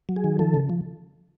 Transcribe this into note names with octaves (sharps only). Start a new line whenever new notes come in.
F#3
G#4
D#3
F3 A4
C#3
F3